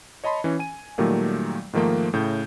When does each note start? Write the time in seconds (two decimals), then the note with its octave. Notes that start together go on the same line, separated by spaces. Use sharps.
0.24 C#5 D#5 A5 B5 C6
0.44 E3 C#4
0.59 G#5 D#7
0.98 A#2 D#3 F#3 G3 A3 A#3
1.73 G#2 D#3 F3 A3 A#3
2.13 A2 C#3 G6